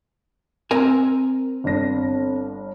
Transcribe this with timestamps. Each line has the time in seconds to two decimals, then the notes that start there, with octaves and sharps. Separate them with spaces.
0.71 C4 A#4 G#5
1.64 G1 D4 A#6